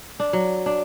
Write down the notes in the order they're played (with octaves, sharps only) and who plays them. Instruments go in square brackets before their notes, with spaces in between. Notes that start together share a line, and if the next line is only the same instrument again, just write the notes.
[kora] D4
F#3
D4